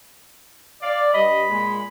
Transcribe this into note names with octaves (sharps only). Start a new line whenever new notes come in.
D5 F5
G2 D#5 B5
A#2 G#3